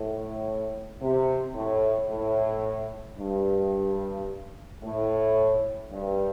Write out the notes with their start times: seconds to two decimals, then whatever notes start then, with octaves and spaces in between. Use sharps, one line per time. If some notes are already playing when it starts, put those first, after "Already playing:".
Already playing: A2
1.00 C3
1.55 A2
2.10 A2
3.18 G2
4.82 A2
5.91 G2